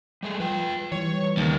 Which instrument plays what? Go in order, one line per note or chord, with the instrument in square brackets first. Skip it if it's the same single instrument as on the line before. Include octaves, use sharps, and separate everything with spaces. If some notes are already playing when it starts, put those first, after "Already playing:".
[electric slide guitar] G3 A3 G#4
[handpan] F3 [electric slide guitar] B4 G5
[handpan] E3 G3 [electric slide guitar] C#5
[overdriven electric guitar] D#2 [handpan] C#3 D#4 [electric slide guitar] G3 A#4